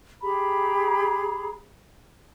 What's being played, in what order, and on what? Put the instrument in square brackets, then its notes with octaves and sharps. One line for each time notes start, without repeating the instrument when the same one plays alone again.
[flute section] G4 G#4 A#5 B5